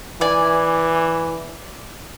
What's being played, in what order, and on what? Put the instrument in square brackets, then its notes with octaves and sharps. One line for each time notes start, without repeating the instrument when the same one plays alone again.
[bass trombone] E3 [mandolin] D5 G#5